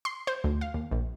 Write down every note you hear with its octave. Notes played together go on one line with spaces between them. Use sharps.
C6
C5
D2
F5
D#2
A#1